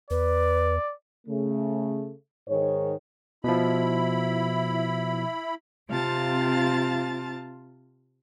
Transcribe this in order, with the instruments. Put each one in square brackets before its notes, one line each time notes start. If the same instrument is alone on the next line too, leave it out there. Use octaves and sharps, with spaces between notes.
[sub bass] E2 [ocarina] B4 [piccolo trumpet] D5
[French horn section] C#3 A3
G#2 D#3 C#5
[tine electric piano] B2 F3 [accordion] E4 B5
[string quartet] C3 C4 F4 F5 A5 A6